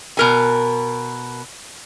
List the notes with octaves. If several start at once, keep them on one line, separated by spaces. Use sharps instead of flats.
B2 A#4 G#5